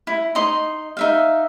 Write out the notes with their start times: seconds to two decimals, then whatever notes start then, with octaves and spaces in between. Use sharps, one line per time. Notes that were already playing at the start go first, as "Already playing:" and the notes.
0.07 E4
0.35 D#4 D#5 C6
0.97 D#4 E5 F5